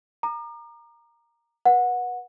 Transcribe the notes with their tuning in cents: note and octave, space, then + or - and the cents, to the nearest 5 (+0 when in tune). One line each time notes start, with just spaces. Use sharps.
A#5 +0 D6 +45
B4 -25 F#5 -20